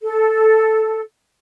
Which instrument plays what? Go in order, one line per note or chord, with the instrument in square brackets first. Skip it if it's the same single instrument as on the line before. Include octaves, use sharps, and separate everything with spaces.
[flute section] A4